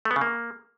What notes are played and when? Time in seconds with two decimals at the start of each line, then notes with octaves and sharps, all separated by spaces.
0.05 A3
0.11 B3
0.16 C#3
0.21 A#3